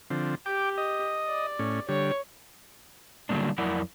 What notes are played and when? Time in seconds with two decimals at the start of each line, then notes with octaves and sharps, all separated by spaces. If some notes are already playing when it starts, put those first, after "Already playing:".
0.10 D3 F3 C4
0.46 G4 G5 D6
0.78 D#5
1.27 D5
1.59 A2 C#4
1.89 D3 G3 C#5
3.29 D3 F#3 G3 A#3 D4
3.58 F2 F#3 E4 A#4 D5 F#5